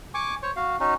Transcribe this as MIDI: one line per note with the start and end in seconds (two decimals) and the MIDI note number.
0.14 0.35 80
0.14 0.35 85
0.14 0.35 86
0.43 0.51 72
0.43 0.51 73
0.43 0.51 85
0.56 0.77 66
0.56 0.77 77
0.80 0.94 61
0.80 0.94 63
0.80 0.94 66